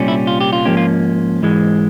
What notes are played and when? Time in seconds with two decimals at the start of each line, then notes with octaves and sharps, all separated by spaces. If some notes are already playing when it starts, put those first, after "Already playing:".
Already playing: C2 A#2 G3 C#4
0.08 E4
0.27 F4
0.41 G4
0.53 F4
0.65 G#2 F3 A#3 C#4 G4
0.77 F4
1.42 G#2 E3 G#3